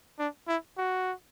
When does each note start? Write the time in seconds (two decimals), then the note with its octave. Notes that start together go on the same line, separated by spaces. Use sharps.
0.19 D4
0.48 E4
0.78 F#4